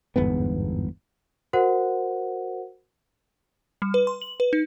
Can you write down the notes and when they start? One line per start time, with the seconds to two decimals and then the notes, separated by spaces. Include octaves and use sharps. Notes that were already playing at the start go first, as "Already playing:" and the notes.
0.16 G1 E2 G#2 B3
1.53 F#4 A#4 C5 F#5
3.82 G3
3.94 B4
4.07 C6
4.22 F#7
4.40 B4
4.53 D#4